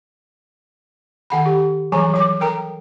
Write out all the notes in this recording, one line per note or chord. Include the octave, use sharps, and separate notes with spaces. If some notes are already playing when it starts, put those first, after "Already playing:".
D#3 F#5 G5 B5
G4
E3 F#3 G3 G#5 A#5
F#3 D6
A4 A#4 G5 A#5